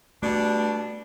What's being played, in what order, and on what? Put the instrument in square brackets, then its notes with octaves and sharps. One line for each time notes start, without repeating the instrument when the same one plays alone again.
[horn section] B2 G3 D4 [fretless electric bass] A3